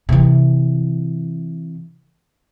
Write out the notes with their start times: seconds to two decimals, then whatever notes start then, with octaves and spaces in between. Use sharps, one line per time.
0.09 C3 E3